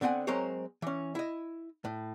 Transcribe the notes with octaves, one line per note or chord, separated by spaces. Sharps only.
D3 B3 C4 F#5 G#5
F#3 G#3 C4 A#4 C5 C#5
E3 C#4
E4 D#5
A2